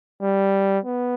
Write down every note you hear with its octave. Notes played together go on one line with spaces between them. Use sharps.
G3
B3